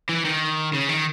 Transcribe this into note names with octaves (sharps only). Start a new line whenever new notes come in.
E3
D#3
C#3
D#3